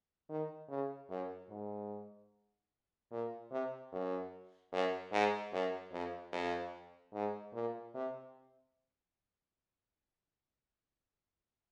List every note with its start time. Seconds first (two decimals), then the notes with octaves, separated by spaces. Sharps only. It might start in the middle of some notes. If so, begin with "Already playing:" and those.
0.29 D#3
0.69 C#3
1.09 F#2
1.50 G#2
3.11 A#2
3.51 C3
3.92 F#2
4.72 F#2
5.12 G#2
5.53 F#2
5.92 F2
6.32 F2
7.13 G#2
7.53 A#2
7.94 C3